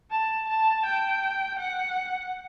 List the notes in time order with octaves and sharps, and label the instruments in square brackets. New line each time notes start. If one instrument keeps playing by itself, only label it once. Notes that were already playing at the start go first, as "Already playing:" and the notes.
[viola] A5
A5
G5
F#5